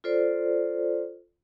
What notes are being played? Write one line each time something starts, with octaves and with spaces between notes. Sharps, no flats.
F4 A4 C5 D5